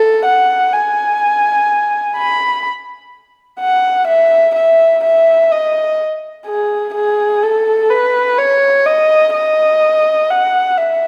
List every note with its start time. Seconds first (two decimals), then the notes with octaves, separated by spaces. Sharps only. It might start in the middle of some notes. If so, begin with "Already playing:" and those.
Already playing: A4
0.26 F#5
0.73 G#5
2.17 B5
3.60 F#5
4.08 E5
4.55 E5
5.04 E5
5.52 D#5
6.47 G#4
6.95 G#4
7.43 A4
7.91 B4
8.38 C#5
8.86 D#5
9.34 D#5
10.30 F#5
10.77 E5